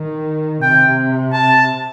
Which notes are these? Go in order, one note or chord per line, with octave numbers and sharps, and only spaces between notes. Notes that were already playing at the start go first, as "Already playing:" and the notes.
Already playing: D#3
C3 G5
A5